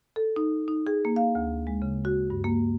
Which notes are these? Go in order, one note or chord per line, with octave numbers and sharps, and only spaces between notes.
A4
D#4
D#4
G#4
A#3
F5
D2
G#3
C#3
F#4
G2
A#3